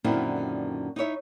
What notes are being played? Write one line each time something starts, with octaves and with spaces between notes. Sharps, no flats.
F#2 A#2 D3 D#3 C4 E4
D#4 E4 C#5 E5